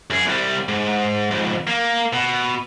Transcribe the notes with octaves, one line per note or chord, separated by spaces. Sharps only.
F#2 G#4
C2 G3
G#2
F2 G#2
A#3
B2